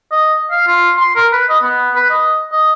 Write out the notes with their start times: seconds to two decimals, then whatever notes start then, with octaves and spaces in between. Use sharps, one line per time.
0.12 D#5
0.51 F5
0.67 F4
0.97 C6
1.16 A#4
1.33 B4
1.49 D#5
1.63 B3
1.96 B4
2.10 D#5
2.52 D#5